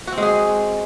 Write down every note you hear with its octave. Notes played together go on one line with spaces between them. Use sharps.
F#4
C4
G#3
G#4